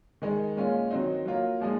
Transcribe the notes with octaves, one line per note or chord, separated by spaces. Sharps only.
D#3 G#3 D#4
A#2 G#3 C#4 F4
D#3 F#3 C4 D#4
F#3 A#3 F4
A#2 F3 G#3 D#4